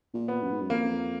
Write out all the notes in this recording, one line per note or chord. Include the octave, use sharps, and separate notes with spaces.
A#2
B3
F#2
G#2
F#2
F2 A#3